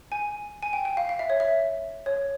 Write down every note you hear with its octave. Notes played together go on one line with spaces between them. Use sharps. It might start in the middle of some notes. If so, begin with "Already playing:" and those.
G#5
G#5
G5
G5
F5
F5
E5
C#5
E5
C#5